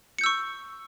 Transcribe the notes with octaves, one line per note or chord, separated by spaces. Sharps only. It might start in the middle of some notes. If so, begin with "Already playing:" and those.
C#6 E6 G6 C#7